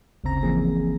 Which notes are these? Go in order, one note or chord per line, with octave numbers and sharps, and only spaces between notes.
G1 D2 C#3 C4 A#5 A#6
E3 F3 A#3 C4 G#4